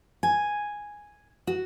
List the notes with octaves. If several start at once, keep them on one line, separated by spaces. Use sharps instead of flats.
G#5
F#4